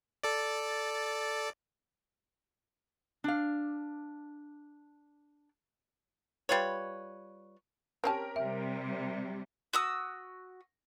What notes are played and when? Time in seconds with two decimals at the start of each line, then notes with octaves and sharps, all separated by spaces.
0.24 A4 D5
3.24 D4 F5
6.49 G3 F4 B4 C#5
8.04 C4 C#4 G4 A#4 A5
8.36 C3 G3 E5
9.73 F#4 D#6 E6